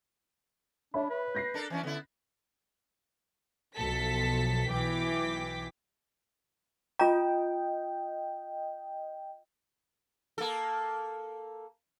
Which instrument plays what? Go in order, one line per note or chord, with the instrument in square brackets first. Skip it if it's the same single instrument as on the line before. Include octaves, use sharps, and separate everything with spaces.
[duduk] D4 [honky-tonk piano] C#5 E5 B5
[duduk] B4
[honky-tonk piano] G6 A#6 C7
[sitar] D4 A4 A#4
E3 C#4 D4
[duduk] D3 [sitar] B3 E4
[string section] B1 F3 A4 B6
B1 E3 G5 D6 B6
[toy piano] F4 A#5 [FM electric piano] D#5 G5
[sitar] A#3 A4